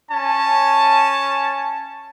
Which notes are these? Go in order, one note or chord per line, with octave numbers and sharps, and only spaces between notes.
C#4 G#5 A5